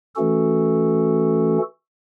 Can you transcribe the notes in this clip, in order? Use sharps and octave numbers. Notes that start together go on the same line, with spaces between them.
E3 A3 C#4 F#4 A4